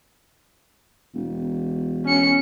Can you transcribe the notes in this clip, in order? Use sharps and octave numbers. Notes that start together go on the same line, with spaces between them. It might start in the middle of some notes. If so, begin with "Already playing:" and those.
E1
C#4 C#7